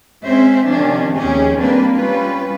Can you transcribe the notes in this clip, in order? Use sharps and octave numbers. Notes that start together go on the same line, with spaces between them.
G#3 C4 C#4 C5 E5
C3 D#3 F3 C#4 D4
D#2 F3 C#4 G4 G#4
G3 A#3 C4 D4 B4
G3 C#4 F4 B4